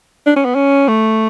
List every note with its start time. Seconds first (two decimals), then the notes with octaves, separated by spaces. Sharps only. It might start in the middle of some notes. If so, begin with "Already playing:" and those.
0.26 D4
0.36 C#4
0.45 B3
0.55 C#4
0.88 A3